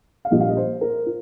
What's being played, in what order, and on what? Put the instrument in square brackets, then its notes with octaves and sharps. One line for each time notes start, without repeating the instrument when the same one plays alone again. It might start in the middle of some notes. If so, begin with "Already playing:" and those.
[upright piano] F5
A#1 A#2 G3 A#3 D#5
F5
D#5
C5
A#4
F4